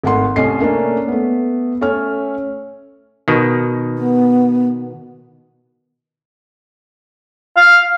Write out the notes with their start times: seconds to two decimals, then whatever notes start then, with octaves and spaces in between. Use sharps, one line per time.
0.04 G#1 A3 F#5 C6
0.36 C2 A3 C#4 D#5 C7
0.60 A3 A#3 C#4 D4
1.08 A3 B3
1.81 A3 C#4 A4 C#5 F6
3.28 B2 D#3
3.98 B3
7.57 F5